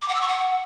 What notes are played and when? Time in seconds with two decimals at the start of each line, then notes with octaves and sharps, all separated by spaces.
0.02 D6
0.08 F#5
0.15 E6
0.21 C#6
0.28 F#5